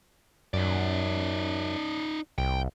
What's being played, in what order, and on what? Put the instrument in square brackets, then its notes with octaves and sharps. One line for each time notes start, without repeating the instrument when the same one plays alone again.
[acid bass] F#2 [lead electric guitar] D#4 D5
[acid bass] C2 [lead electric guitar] G5